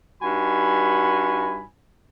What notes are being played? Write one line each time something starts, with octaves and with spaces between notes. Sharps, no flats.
G2 D#4 F#4 G#5 B5